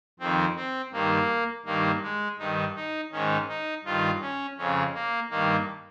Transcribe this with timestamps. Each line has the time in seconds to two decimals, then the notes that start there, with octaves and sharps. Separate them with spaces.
0.20 F2 D#3 C4
0.56 C4
0.93 G2 D#3 A#3
1.66 G2 D#3 A#3
2.02 G#3
2.39 G2 D#3 D#4
2.75 D#4
3.12 G#2 D#3 C#4
3.48 D#4
3.84 G2 D#3 F4
4.21 C#4
4.57 F2 C#3 C#4
4.94 A#3
5.31 G2 D#3 A#3